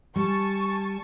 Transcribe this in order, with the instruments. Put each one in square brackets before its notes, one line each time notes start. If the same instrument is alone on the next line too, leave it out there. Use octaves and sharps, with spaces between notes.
[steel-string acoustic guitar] G3 [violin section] G#5 A5 C#6